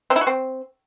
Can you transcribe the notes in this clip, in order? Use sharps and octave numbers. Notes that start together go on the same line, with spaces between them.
C4
E4
F#4
C4